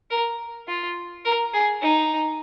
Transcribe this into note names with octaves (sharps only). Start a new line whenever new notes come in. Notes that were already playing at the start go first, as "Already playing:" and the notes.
A#4
F4
A#4
G#4
D#4